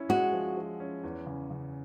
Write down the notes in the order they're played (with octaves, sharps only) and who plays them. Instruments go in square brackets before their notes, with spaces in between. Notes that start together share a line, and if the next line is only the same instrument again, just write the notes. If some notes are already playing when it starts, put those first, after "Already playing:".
Already playing: [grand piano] C#4 E4
[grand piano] G#3 [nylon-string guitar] F#4
[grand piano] F3
F3
C#4
E2
C#3
C#3